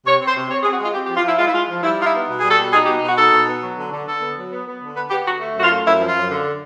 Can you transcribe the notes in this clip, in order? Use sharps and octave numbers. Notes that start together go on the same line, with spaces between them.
C3 C#5
C4
C5
C3
C4 C#5
G#4
C4
F#4
G#3 F4
C4 G4
G4
F3
F4
F3 E4
G#3 F4
E4
G#3 F4
F3
G3 E4
D#4 F4
E4
B3
B2
G3 G#4
A4
B2
D#4 G#4
G4
B2
B2 F#4
D#4 A4
B2
B3
F#3
D3
D3
D3 A4
B3
F#3
B3
B3
D3
B3 B4
B3 G4
D3 F#4
A3
F#2 F#4
F4
A3
F#2 E4
F3
F4
F#2
D3